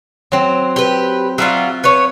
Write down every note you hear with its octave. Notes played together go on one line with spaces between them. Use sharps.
F#3 C4
G4 B4
F#3 G3 F4 E5
B3 C#5